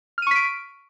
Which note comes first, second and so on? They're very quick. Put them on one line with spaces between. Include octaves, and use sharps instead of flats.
F6 D#7 C#6 B6 D7